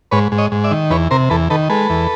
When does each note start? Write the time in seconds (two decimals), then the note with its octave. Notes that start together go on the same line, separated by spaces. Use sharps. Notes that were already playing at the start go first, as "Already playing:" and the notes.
0.11 G#2 B4 C#5
0.32 G#2
0.38 C#5 D#5
0.52 G#2
0.64 D5 E5
0.71 D#3
0.90 E2 B4 C#5
1.11 C3 A#4 C5
1.30 E2 A4 B4
1.50 D#3 A4 B4
1.69 G#3 A4 B4
1.89 E2